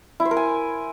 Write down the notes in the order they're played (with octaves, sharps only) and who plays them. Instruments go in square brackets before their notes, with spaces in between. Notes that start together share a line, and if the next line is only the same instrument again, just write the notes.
[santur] E4
C5
A#4
G#5